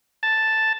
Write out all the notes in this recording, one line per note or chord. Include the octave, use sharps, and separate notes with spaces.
A5